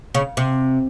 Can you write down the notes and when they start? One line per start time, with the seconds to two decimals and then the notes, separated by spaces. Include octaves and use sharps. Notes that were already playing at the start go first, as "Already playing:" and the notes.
0.15 C#3
0.37 C3